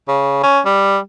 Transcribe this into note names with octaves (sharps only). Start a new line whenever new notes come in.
C#3
C#4
G3